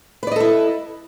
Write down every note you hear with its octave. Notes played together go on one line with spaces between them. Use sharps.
E4 A4 B4 D5 D#5